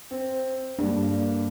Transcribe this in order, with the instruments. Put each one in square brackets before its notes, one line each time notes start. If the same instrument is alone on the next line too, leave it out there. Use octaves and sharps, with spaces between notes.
[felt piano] C4
[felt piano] G2 [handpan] A#3 D4